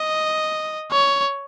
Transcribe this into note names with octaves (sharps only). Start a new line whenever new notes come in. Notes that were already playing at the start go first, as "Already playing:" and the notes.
Already playing: D#5
C#5